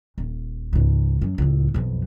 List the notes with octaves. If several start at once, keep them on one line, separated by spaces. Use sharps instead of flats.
D#1
C#2 G#2
F#2
C#2 A2
B1 F2